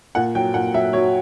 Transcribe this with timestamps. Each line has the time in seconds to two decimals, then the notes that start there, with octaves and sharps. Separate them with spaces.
0.15 A#2 F#5
0.35 F#3 G5
0.54 A#2 F#5
0.74 F#3 E5
0.93 F#3 C#5